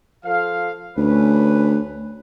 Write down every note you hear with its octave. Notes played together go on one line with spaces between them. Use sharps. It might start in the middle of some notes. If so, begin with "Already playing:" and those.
F3 A4 F5
D2 C#4 B4